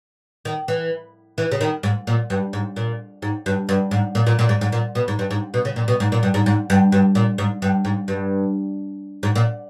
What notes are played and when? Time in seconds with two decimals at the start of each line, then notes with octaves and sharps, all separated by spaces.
0.45 D#3
0.68 E3
1.38 E3
1.52 C#3
1.61 D#3
1.83 G#2
2.07 A#2
2.30 G2
2.53 G#2
2.76 A#2
3.22 G#2
3.46 G2
3.69 G2
3.91 G#2
4.15 A#2
4.27 A#2
4.39 A#2
4.49 G#2
4.61 G#2
4.72 A#2
4.95 B2
5.08 G#2
5.19 G2
5.31 G#2
5.54 B2
5.65 C#3
5.76 A#2
5.88 B2
6.00 G#2
6.12 A#2
6.23 G2
6.34 G#2
6.46 G#2
6.70 G2
6.92 G2
7.15 A#2
7.38 G#2
7.62 G2
7.85 G#2
8.08 G2
9.23 G#2
9.35 A#2